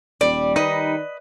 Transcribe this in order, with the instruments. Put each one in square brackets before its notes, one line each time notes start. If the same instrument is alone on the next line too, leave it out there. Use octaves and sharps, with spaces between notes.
[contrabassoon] D#1 [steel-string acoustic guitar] G3 [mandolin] D5
[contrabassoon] D#3 [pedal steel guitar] D#4 [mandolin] B4 D#5